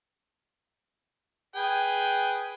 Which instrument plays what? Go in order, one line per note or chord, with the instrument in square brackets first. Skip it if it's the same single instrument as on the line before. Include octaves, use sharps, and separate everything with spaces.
[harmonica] G#4 B4 G5